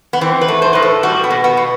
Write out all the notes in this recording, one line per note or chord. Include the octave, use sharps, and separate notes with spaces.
B3
E3 C4
B4
A3
C5
A2 B4
A4
G3 F#4
B3
B2
B3
B2